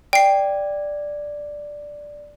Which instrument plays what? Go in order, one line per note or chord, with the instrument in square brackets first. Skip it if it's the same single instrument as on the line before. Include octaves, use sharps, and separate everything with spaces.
[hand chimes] D5 [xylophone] G5 C7